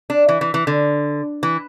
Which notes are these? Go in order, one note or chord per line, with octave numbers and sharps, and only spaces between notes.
D4
E3
E3
E3
D3
E3